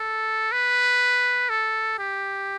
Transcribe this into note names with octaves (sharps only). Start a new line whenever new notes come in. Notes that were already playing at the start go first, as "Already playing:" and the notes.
Already playing: A4
B4
A4
G4